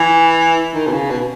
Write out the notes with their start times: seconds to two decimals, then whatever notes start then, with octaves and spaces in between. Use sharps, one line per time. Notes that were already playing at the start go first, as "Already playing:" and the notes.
Already playing: E3
0.74 D#3
0.87 B2
0.92 C#3
1.10 B2